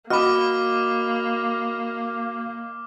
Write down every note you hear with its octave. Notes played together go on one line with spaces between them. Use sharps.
A#3 F#4 D#5 B5 D6 D#6 F6